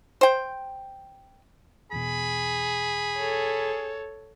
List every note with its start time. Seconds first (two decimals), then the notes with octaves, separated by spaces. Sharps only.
0.21 C5 G5
1.93 E2 B2 G#4 B5
3.18 A4 C#5